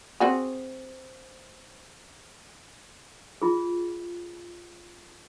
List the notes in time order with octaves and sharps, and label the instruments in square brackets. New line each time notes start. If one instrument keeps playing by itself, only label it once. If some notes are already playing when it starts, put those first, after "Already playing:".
[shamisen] C4 F#4 G#4
[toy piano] F4 G#4